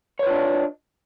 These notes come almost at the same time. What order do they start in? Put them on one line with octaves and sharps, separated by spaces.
C#5 B4 F4 D4 D#5